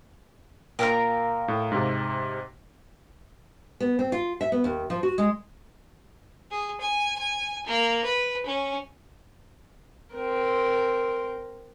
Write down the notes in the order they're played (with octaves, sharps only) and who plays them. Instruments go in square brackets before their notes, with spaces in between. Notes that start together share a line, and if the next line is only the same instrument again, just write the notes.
[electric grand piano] A#2 G5 [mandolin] A#4 F5 A#5
[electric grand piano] A2
G#2 C3
[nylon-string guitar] B3
C4
F4
E5
B3
D#2
F3
F#4
G#3
[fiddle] G#4
G#5
G#5
A#3
B4
C#4
[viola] C4 A#4